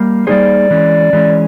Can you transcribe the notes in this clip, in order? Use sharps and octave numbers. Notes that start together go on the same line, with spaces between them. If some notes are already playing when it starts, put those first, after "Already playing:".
Already playing: G3 A#3
G3 A#3 D#4 G#4 C5 D5
E3 G#3 C#4
E3 G#3 C#4